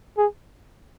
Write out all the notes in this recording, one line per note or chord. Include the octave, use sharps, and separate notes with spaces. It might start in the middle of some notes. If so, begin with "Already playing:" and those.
G#4